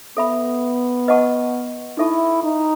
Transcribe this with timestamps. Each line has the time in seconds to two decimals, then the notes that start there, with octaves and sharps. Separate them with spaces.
0.17 B3 A4 E5 B5
1.08 B4 D#5 F#5 A5 C#6
1.97 D#4 E4 A4 E5 A5 C#6
2.43 D#4